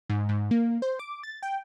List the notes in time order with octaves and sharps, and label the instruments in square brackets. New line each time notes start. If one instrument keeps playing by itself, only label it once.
[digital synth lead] G#2
G#2
A#3
C5
D6
A6
G5